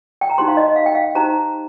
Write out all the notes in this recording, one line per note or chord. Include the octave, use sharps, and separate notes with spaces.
G5
A#5
D#4 G4 C5 C6
F5
D#5
F5
G5
F5
D#4 G4 C5 A#5